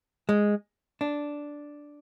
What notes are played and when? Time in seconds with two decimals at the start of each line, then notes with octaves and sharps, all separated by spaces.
0.29 G#3
1.01 D4